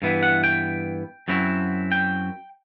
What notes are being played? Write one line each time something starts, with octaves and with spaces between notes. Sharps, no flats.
G2 E3 B3 E4
F#5
G5
F#2 F#3 C4 E4
G5